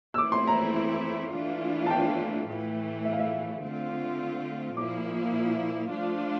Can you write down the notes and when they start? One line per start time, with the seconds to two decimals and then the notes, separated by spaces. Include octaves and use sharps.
0.14 E6
0.18 E3 A3 C4 E4 D6
0.32 C6
0.47 A#5
1.33 E3 A3 D4 F4
1.86 A5
1.90 G5
2.48 A2 E3 A3
3.05 E5
3.12 F5
3.19 E5
3.62 D3 A3 C4 F4
4.77 A#2 F3 A#3 E4 D6
5.91 F3 A3 D4 F4